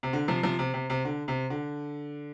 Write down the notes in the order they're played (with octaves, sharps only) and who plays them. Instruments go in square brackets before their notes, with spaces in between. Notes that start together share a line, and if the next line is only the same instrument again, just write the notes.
[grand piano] C3
D3
C3 F3
C3 F3
C3
C3
C3
D3
C3
D3